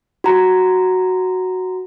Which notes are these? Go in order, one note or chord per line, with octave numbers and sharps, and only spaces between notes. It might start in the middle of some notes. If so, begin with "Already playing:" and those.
F#4 A#5